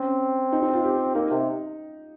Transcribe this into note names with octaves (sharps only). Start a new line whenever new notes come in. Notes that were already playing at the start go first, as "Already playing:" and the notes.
Already playing: C4 C#4
D#4
D#4
F4
G4
A#3 D#4
C3